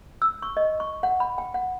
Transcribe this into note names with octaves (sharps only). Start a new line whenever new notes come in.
E6
C#6
D#5
C#6
F#5
B5
G5
F#5